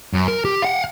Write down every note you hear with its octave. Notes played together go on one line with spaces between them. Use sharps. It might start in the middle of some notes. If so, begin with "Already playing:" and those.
F#2
A#4
G4
F5 F#5